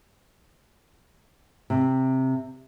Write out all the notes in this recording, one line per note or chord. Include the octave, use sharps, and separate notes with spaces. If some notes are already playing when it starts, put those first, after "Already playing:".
C3